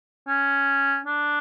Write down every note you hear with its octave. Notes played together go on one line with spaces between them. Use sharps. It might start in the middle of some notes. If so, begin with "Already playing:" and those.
C#4
D4